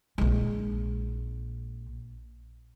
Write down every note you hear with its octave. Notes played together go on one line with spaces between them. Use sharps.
A#1 G#3